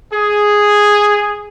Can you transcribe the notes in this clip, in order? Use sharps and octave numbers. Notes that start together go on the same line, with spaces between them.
G#4